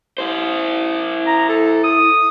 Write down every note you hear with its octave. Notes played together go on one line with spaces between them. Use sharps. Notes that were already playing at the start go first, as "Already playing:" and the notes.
E4 C5
A#5
A4
D#6